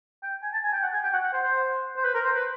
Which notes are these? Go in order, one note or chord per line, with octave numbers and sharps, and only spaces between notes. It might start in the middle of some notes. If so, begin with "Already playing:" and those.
G5
G#5
A5
G#5
G5
F#5
G#5
G5
F#5
F#5
C5
C5
C5
B4
A#4
C5
B4